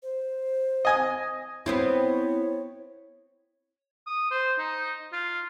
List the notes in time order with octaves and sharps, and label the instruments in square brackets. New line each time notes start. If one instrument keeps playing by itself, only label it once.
[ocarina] C5
[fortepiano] D#5 G#5 D#6
[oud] B3 C4 E4 [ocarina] C#5
[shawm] D#6
C5
D#4
F4